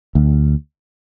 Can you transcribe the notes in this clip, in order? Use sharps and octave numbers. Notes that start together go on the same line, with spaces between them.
D2